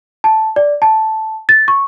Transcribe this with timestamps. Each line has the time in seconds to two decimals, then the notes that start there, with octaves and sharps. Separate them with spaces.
0.24 A5
0.56 D5
0.82 A5
1.49 A6
1.68 C#6